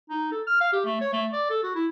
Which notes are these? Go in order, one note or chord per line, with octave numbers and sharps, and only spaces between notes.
D#4
A4
F6
F5
G4
A3
C#5
A3
D5
A4
F#4
E4